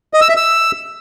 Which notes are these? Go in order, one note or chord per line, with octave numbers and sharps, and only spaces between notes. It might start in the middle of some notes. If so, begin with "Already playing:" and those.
D#5
E6
E5
E6